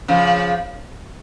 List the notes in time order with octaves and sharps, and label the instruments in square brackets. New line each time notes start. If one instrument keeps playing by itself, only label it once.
[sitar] C#3 F3